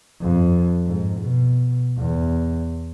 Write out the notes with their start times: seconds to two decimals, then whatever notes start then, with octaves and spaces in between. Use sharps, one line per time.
0.22 F2
0.86 G#2
1.20 B2
1.98 E2